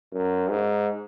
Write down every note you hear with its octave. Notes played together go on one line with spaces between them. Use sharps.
F#2
G#2